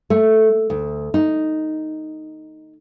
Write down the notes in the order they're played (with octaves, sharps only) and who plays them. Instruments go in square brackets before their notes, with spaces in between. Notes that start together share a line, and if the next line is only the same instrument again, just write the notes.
[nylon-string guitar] A3
D2
D#4